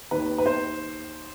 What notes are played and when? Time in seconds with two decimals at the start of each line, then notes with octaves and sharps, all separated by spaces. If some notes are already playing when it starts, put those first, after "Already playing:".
0.11 D#2 D#3 B4
0.38 B4
0.46 C5